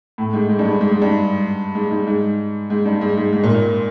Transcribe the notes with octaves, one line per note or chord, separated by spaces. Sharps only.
A2
G#2
G#2
G2
G#2
G#2
G#2
G2
G#2
G#2
G#2
G#2
G2
G#2
G#2
G#2
A#2
A#2